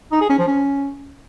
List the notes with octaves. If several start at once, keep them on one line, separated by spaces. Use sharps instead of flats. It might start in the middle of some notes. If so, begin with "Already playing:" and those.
D#4
G#4
C#4
F3
C#4